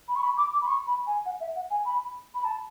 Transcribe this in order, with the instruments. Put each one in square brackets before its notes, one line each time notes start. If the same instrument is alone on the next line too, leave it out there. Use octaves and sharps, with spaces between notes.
[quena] B5
C#6
B5
D6
D6
B5
C#6
B5
G#5
F#5
E5
F#5
G#5
B5
B5
A5